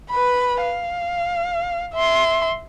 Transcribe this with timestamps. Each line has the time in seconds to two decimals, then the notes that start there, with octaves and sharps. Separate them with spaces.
0.11 B4 B5
0.62 F5
1.94 E5 C6